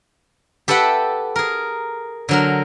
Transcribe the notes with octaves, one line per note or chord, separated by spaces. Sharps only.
G4 A4 B4 E5 F#5 G5
G#4 A#4
D3 F#3 A#4